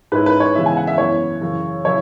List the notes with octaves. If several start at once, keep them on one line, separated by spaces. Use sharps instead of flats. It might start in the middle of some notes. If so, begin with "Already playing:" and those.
G#2 G#3 C#4 E4 B4
B4
C#5
C#3 E3 G#3 B3 E5
G#5
F#5
E5
F#2 E3 B3 E4 C#5
F#2 C#3 E3
C#3 F#3 E4 C#5